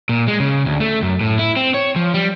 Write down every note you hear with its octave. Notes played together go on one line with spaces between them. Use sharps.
A#2
G#3
C#3
D2
A3
F#2
A2
E4
C4
C#5
F3
G3